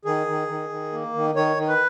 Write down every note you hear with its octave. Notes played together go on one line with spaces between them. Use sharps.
D#3 G#4
D#3
D#3
D#3
A#3
D#3
D#3 C#5
D#3
B4